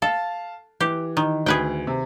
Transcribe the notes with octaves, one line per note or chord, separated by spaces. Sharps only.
A4 F5 A5
E3 G4
D#3
D2 G#4 B4 G5
C3